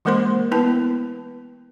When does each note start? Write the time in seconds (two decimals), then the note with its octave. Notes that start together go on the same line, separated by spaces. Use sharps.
0.05 E3 G#3 A#3 A#4 C5 C6
0.52 B3 E4 B4 A5